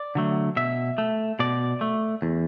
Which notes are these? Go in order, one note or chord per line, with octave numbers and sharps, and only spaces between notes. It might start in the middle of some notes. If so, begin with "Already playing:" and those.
Already playing: D5
D3 F#3 A3
B2 E5
A3
B2 D5
A3
E2